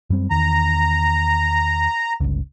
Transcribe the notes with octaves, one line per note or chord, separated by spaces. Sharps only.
F#2 G3 C4
E2 D#3 A#5
G1 C#2